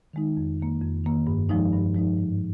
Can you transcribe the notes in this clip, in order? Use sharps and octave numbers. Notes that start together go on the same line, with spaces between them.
D#3 G#3 D#4
F2
D#3 A#3
F2
D#3 A#3
G2
F3 G#3 D#4
G2
F3 G#3 D#4
G#2